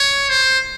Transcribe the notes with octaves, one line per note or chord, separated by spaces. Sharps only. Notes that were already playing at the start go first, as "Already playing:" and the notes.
Already playing: C#5
C5